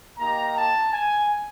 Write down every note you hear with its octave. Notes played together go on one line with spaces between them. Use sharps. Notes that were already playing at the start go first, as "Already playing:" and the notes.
A#3 D#4 G4 A#5
A5
G#5